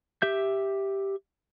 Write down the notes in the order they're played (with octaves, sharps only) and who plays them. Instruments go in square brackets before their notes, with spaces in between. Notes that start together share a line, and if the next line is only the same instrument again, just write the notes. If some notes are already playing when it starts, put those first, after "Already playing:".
[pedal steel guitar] G4 E5 G6